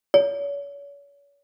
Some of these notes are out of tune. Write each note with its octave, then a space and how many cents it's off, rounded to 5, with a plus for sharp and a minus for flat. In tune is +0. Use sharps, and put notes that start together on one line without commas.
C#5 +40